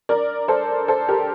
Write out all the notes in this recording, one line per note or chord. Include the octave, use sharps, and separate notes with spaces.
A#4 D5
A4 C5
A4 C5
G4 A#4